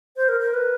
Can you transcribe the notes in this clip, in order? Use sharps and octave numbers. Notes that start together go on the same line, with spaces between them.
C5
A#4
A#4
B4